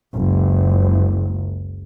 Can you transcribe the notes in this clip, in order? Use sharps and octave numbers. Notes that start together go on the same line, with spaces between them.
F#1 C#2